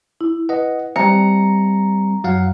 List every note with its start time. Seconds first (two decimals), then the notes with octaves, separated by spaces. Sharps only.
0.21 E4
0.49 B4 D#5 F#5
0.96 G3 C4 A#5 C#7
2.24 F#2 F#3 F5 F#5